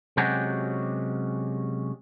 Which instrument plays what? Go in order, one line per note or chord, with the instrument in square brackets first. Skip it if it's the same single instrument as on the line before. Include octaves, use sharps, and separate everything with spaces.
[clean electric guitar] C3 F#3 G#3 C#4 F#4 G4